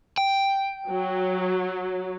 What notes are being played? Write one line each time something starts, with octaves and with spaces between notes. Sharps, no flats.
G5
F#3